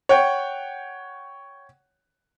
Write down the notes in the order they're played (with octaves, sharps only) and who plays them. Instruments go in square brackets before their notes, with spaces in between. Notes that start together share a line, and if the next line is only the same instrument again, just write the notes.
[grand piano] C#5 F#5 G5